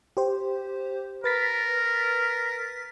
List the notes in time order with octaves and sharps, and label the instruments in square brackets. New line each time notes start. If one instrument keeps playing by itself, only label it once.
[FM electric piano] G4 C5
[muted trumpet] A#4 [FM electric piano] B4 A6 B6